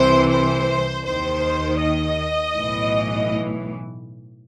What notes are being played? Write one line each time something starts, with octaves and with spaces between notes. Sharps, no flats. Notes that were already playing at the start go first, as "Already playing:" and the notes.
Already playing: C2 C3 E3 C5
C5
D#2 D#3 C5
D#5
B1 A2 E3